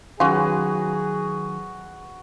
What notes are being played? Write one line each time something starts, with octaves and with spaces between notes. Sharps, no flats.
D#3 F#3 C#4 F4 F#4 G#4 B4